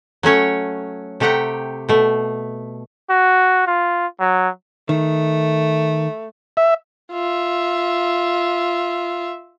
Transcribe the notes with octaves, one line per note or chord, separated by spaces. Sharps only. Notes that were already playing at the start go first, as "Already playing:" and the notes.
F#3 A3 C#4 C#5
C3 A3 G4 F#5 G5 A#5
B2 A3
F#4
F4
F#3
D#3 A3
E5
F4 E5